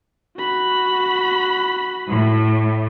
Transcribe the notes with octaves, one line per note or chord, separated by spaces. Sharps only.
F#4 B5
A2